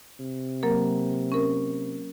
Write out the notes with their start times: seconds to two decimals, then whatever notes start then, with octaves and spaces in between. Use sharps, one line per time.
0.20 C3
0.63 F#3 A#3 A#4
1.32 C#4 A#4